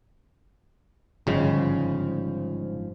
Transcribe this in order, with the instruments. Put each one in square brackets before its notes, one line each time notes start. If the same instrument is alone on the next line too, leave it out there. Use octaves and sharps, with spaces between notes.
[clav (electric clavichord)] G1 C#3 G#3 [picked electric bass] G#2 F3